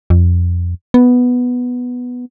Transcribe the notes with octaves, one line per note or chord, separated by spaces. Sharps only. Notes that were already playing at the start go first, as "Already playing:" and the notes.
F2
B3